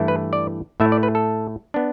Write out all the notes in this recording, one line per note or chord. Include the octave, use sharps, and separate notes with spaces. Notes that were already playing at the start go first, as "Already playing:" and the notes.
Already playing: G2 E3 A3 E4
B4
D5
A2 A3 E4 E5
D5
B4
A4
B3 D4